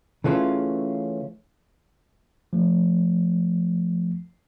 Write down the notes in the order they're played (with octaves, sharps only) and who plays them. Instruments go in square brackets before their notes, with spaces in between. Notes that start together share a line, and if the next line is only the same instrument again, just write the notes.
[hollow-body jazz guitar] C#3 E3 A3 C#4 F4
[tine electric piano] F3 A3